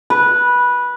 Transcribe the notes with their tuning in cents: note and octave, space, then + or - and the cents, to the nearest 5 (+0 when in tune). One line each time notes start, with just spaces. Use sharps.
B4 -15